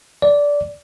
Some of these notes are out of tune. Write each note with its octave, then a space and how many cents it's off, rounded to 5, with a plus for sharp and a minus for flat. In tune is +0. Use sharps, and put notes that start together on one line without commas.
D5 -15